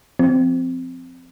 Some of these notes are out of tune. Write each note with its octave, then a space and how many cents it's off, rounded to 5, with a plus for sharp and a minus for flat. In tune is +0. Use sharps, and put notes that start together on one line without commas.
F3 +0 C4 -15